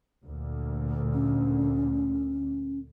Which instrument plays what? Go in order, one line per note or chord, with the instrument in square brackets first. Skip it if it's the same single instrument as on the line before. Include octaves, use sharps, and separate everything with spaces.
[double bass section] D2 A#2
[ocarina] C#4